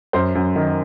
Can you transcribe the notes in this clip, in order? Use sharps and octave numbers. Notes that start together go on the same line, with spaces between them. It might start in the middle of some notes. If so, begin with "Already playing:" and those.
F#2 C5
F#2
D#3